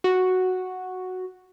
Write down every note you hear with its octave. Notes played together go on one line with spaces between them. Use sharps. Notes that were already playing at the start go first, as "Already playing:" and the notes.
F#4